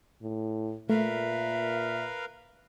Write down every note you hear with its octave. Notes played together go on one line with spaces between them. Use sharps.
A2
A#2 A3 A#4 B4 E5 F5